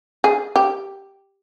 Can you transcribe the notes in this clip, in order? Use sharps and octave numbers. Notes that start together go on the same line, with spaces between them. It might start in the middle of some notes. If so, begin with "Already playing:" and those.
G#4
G4